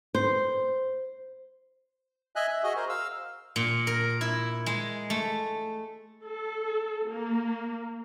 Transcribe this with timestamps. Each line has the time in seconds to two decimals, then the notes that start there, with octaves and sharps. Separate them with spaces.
0.15 C5
2.36 D#5 E5 G#5 F#6
2.48 E5
2.63 F#4 G#4 D#5
2.76 A#4 C5
2.89 F5 E6
3.56 A#2
3.87 A#4
4.21 E4
4.66 G#3
5.10 A3
6.24 A4
7.07 A#3